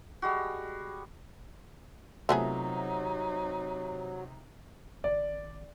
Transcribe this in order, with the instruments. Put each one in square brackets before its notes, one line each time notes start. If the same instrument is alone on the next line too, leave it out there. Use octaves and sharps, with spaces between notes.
[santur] G3 G#3 F#4
[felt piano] C3 F4 E5 [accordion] F#3 [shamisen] A3 B3 G#4 [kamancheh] D#4
[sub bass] G#1 [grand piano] D5